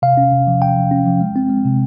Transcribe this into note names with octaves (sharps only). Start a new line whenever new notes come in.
C3 F5
C#4
C3
F3
F3 G5
F3
C#4
F3
G#3
C4
G#3
C3